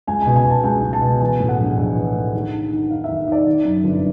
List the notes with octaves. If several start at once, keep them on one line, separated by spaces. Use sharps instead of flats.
C#2 G#5
B2 G#5
G#5
B2 A5
C#2 G#5
C#2
A5
B2
E3 G#5
A2
F#5
A#1
A#1
E3
A2
D#2
D#3
D#3
D#2 F5
D#2 E5
D#3 D5
D#3
F#2
G1